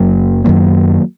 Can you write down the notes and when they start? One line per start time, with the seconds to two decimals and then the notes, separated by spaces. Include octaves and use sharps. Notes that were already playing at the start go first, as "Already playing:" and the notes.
Already playing: F#1 F#2 F#3 A#3
0.44 F#2 D#3 F#3 A#3